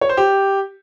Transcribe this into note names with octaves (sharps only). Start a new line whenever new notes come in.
C#5
C5
G4